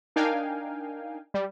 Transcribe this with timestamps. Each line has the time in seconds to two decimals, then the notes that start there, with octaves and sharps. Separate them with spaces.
0.16 D4 D#4 A#4 F5 G5 G#5
1.34 G3